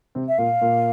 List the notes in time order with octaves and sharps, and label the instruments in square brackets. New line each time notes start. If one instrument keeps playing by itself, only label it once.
[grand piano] C3 C4
[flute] E5
[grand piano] A#2 A#3 [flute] F5
[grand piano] A#2 A#3